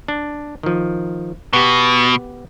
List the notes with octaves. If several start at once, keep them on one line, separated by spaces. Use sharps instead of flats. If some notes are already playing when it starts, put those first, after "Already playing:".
D4
D#3 F3
B2 B3 G4